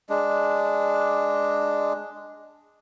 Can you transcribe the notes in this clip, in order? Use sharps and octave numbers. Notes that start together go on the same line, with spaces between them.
G#3 D4